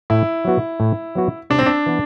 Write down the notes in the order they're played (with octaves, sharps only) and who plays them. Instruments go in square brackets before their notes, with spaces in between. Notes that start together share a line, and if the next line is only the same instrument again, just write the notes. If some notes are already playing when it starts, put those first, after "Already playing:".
[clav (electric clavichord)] A2 [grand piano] E4
[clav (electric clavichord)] F#3 B3 F#4
A2
F#3 B3 F#4
[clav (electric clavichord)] C3 [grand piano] D4
[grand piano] C4
D4
[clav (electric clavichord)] E3 B3